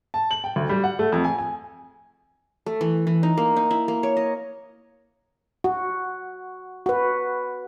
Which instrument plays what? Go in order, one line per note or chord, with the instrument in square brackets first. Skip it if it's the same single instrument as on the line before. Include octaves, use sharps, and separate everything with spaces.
[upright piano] A5
F#7
G5
D2
G3
F#5
A3
F2
G#5
G#5
[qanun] A3
E3
E3
D#4
A#3
D#4
E4
A#3
C#5
D#5
[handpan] F#4
F#4 B4